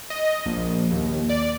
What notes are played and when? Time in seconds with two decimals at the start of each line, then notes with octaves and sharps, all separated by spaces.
0.10 D#5
0.46 A#1
0.92 D#2
1.29 D5